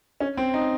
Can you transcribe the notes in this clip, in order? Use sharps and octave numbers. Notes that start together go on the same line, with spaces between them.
C#4
C4
D#4